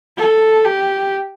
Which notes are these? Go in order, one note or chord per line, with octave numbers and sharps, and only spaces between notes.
A4
G4